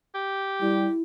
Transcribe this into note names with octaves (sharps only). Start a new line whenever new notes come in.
G4
G3 E4